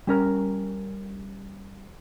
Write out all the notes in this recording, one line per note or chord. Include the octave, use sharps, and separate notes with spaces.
G3 C#4 A#4 A#5